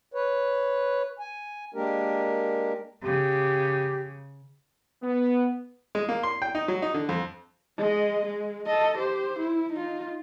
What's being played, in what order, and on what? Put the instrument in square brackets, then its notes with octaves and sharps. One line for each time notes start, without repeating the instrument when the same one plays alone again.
[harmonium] B4 C#5
G#5
G#3 A#3 D4 G4 A#4
[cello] C#3 [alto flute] G4
[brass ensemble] B3
[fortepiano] G#3
A#3
C6
G5
D#4
F#3
D#4
D3
F2
[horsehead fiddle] G#3 D#5
G#3
A4 D#5
G4 C5
E4
D#4 F4